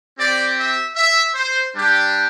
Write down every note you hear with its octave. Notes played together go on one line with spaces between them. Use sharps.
C4 G4 D5
E5
E5
C5
G3 D4 G4